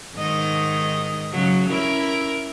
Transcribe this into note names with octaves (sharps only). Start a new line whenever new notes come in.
G#2 D#3 D#5
C#3 F#3
C#4 E4 A#4